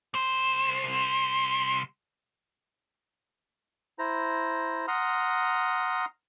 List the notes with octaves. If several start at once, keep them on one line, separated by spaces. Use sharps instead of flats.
C2 C5
E4 C5 A#5
F#5 A#5 C6 D#6 F6